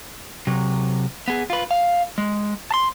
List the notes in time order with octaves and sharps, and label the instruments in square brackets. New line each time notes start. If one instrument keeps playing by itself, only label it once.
[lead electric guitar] C3 F#3
B3 G#4
F4 B4
F5
G#3
A5 C6